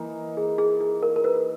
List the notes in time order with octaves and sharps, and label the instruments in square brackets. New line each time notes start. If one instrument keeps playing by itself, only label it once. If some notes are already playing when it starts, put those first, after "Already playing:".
Already playing: [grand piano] E3 A#3 D#4
[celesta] G#4
G#4
G#4
A#4
A#4
B4